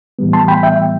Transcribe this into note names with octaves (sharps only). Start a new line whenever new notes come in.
A2 E3 G3 B3
A5 C6
G5 B5
E5 G5